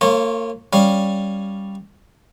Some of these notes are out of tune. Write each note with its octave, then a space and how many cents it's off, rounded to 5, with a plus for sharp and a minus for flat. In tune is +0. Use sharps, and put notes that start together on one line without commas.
A#3 -40 F4 +0 C#5 -30
G3 +0 C#4 +0 F5 +0